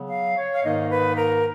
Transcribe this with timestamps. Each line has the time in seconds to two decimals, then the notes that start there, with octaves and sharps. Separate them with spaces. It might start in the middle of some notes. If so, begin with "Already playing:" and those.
Already playing: C#3 F#3 B3
0.08 F5
0.36 C#5
0.54 F5
0.63 G#2 D#3 A#3 D#4 D#5
0.90 B4
1.16 A#4